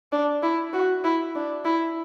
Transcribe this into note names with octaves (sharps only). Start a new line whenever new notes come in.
D4
E4
F#4
E4
D4
E4